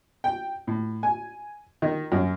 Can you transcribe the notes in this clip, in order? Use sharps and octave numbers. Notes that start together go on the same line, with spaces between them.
G5
A2
G#5
D#3
F#2